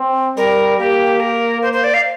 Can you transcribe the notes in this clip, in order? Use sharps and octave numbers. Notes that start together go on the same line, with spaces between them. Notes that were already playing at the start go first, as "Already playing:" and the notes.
Already playing: C4
G3 A#4
A#3 G4
A#4
C5
C5
D5
F5